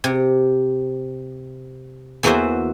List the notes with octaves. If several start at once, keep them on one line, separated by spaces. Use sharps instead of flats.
C3
E2 E3 A#3 F#4 C5 E5